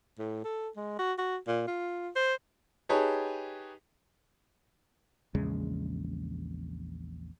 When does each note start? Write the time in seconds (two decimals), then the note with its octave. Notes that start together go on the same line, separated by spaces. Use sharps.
0.18 A2
0.44 A4
0.76 G#3
0.99 F#4
1.18 F#4
1.48 A#2
1.67 F4
2.16 C5
2.89 D#4 G4 G#4 B4 C#5 A5
5.35 A#1 E2 C#3 G#3